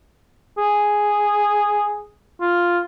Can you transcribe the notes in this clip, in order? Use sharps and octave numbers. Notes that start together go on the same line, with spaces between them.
G#4
F4